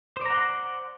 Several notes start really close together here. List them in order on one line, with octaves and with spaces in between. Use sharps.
C5 D5 A#5 F#5 C6